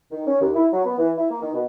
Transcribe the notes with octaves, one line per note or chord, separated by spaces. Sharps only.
D#3
C#4
D#2
E4
F#3
B3
E3
E4
A#3
D#3
B2